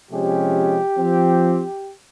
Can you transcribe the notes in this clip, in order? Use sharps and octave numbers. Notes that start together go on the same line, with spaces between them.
C3 F3 G#3 C#4 G4
F3 C4